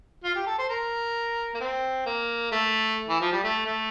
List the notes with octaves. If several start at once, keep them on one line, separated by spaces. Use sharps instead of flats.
F4
G4
A4
C5
A#4
A#3
C4
A#3
A3
E3
F3
G3
A3
A3